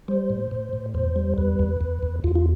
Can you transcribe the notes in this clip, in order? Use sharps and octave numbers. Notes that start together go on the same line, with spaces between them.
G3 C5
A2
A2
A2
E2 C5
G3
E2 B4
E2
E2
E2
E2 F4
F4